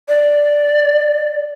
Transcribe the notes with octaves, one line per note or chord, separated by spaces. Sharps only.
D5